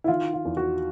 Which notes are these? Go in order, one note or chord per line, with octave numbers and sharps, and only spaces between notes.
E4
D#3 F4
F4
E2
F#4